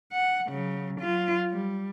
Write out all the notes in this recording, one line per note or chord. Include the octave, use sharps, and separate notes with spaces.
F#5
C#3 F#3
F#3 F4
G3